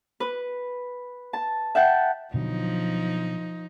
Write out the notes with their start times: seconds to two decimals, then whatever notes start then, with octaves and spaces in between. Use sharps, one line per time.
0.20 B4
1.33 A5
1.75 E5 F#5 G5 A5
2.34 B2 D3 F3 F#3 D#4